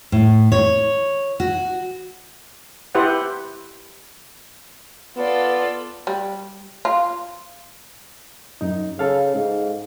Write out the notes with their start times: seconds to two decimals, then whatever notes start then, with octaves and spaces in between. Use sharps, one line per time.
0.12 A2
0.52 C#5
1.40 F#4
2.95 E4 G4 B4 C5 F#5
5.16 B3 F4 A4 D5
6.07 G3
6.85 F4
8.61 F#2 D#4
8.99 C#3 A4 F5
9.35 G#2